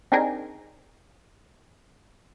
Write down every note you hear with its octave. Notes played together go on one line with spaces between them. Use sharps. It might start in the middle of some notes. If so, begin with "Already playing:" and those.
C4 D4 D#4 G4 G#4 A#4